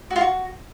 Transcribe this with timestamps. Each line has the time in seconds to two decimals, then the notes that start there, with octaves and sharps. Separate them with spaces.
0.11 F#4
0.16 F4
0.21 F#4